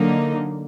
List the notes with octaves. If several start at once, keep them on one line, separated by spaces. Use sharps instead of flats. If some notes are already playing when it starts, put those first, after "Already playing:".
Already playing: D3 F#3 A#3 D#4